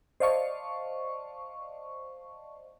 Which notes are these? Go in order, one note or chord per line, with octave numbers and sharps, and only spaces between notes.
C5 D5 D#5 F5 A5 C#6